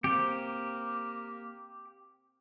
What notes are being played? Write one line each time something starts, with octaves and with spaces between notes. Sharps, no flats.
A#3 C4 G4